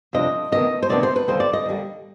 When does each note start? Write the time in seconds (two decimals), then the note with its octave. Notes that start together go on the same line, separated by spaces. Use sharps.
0.13 F2 C3 G3 D4 D#5
0.52 D2 C3 D#3 B3 D4 D#5
0.82 C5
0.89 D2 C3 D#3 B3 D4 D5
1.03 C5
1.16 B4
1.28 D#2 D3 G3 C5
1.40 D5
1.53 D#5
1.66 D#2 D3 G3